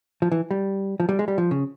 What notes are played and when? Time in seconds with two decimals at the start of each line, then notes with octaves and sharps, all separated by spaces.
0.22 F3
0.32 E3
0.51 G3
1.00 F3
1.09 G3
1.19 G#3
1.28 G3
1.38 F3
1.51 C#3